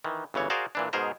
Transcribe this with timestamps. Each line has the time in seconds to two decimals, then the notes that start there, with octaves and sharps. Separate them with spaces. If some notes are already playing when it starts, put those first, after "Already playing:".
0.04 D#3 E3
0.34 G1 C#3 E3 C#5
0.50 F#4 G#4 A#4 C5 D5 F5
0.75 A#2 E3 D4
0.93 G#2 B2 G#4 A#4 C5 A#5